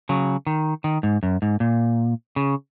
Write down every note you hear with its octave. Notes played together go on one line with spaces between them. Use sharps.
C#3 F#3
D#3
D#3
G#2
F#2
G#2
A#2
C#3